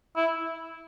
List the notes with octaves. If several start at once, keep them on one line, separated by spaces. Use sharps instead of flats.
E4